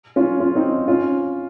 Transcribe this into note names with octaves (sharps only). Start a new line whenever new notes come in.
C#4 F4
C#4 F4
C4 D#4
C#4 F4